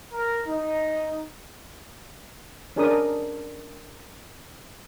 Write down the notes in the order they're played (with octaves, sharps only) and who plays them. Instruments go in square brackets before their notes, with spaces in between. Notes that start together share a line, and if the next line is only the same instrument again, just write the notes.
[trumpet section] A#4
D#4
[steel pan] C#4 D4 G#4 A#4 D5 D#6